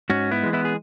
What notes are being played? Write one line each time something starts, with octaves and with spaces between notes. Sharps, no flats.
G#2 C#4 F#4
B3 E4
E3 G#3
B3 E4
G#4